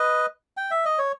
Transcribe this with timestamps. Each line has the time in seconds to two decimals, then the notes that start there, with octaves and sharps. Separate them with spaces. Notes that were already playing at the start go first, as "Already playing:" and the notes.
Already playing: B4 D#5
0.57 G5
0.71 E5
0.85 D#5
0.98 C#5